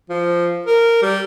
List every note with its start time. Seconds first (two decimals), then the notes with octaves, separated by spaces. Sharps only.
0.09 F3
0.66 A#4
1.02 G3